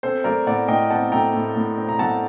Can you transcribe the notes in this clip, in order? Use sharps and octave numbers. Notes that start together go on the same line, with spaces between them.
C4 A4 C5
A3 A#4 D5
A2 D5 F#5
A2 D#5 G5
C4 F#5 A5
A3 G5 A#5
A2
A2
C4
A#5
A3 F#5 A5